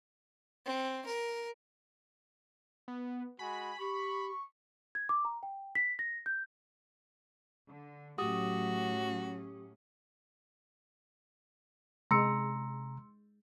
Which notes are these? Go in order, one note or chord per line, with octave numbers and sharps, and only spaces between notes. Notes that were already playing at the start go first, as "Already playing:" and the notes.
C4
A#4
B3
G#3 F#4 G#5 B5
G4 C#6
G#6
D6
A#5
G5
B6
A#6
G6
D3
A2 F#3 C#4 F#4 G4 D#6
C3 G#3 A#5 C6 E6 C#7